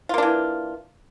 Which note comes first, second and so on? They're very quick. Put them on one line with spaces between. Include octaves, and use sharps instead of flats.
F4 A#3 D4 E3